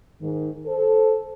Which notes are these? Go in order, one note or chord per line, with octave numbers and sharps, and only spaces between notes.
G#2 D#3
A4 C5